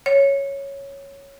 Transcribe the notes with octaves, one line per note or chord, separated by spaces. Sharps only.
C#5